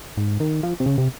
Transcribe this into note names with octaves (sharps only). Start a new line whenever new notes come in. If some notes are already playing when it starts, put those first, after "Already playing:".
G#2
D#3
F3
C3
C#3
C3